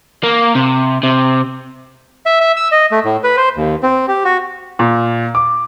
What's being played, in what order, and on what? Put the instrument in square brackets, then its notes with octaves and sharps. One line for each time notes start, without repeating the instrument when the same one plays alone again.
[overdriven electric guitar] A#3
C3
C3
[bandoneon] E5
E5
E6
D#5
A3
A2
B4
C5
D#2
C4
G4
F#4
[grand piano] A#2
D6